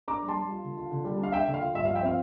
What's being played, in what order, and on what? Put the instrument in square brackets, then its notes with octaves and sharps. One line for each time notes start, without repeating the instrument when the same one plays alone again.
[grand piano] D4 A#5 D6
G3
A5 C6
G3
F4
D3
F4
D3
G3
D4 F5
D4 E5 G5
D3
F5
F4
G2 E5
F5
F3
E5 G5
C4 F5